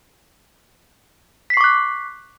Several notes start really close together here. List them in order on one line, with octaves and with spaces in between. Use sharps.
B6 C7 C#6 D6 F#6